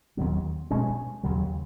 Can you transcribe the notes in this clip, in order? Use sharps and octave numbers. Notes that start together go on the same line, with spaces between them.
D#2 D#3 F#3 B3
B2 G#3 C#4
D#2 C#3 F#3